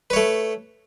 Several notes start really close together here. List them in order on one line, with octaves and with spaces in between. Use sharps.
B4 C#5 A3